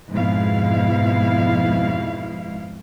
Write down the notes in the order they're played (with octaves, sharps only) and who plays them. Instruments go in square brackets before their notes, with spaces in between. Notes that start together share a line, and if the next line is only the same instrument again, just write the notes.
[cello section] F2 G#2 B2 G#3 E4 F5